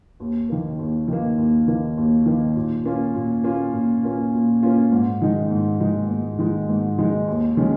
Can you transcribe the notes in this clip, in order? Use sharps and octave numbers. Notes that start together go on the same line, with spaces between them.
D#2
D#3 A#3
D#2
D#3 A#3
D#2
D#3 A#3
D#2
D#3 A#3
A#2
A#3 C#4 F4
A#2
A#3 C#4 F4
A#2
A#3 C#4 F4
A#2
A#3 C#4 F4
G#2
D#3 G#3 D#4
G#2
D#3 G#3 D#4
G#2
D#3 G#3 D#4
G#2
D#3 G#3 D#4
D#2
D#3 G#3 C#4